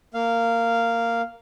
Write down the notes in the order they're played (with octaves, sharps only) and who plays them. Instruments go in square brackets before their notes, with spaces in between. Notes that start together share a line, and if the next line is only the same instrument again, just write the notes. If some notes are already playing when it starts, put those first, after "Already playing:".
[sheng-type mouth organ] A#3 F5